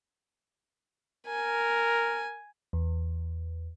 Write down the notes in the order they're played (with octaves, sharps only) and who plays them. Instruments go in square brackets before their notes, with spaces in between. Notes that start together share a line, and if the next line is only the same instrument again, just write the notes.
[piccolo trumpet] A#4 [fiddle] G#5
[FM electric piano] E2